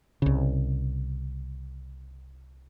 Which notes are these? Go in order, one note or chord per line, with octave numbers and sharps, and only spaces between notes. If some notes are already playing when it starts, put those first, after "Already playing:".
C2 C#3